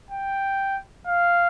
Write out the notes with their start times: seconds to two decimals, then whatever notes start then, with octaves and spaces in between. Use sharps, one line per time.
0.11 G5
1.08 F5